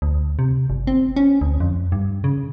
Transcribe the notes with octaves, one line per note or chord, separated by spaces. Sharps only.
D2
C3
G1
C4
C#4
D2
F2
G2
C#3